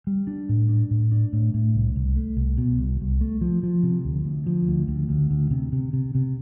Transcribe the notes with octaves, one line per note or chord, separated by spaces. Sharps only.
G3
D4
A2
D4
A2
D4
A2
A2
C2
C2
A3
C2
B2
C2
C2
A3
F3
F3
C3
D2
D2
F3
D2
D2
D2
D2
C3
C3
C3
C3